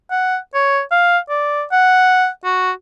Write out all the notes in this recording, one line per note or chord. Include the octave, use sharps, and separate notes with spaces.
F#5
C#5
F5
D5
F#5
F#4